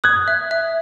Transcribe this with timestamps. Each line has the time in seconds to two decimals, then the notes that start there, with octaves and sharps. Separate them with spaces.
0.04 D#6 F#6 G#6
0.28 E5
0.51 E5